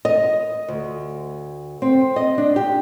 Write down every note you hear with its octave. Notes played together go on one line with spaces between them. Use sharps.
D#5
D2
C4
D#5
D4
G4